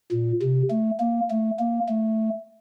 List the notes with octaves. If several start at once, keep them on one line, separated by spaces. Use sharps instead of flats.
A#2
C3
A3
A#3
A3
A#3
A3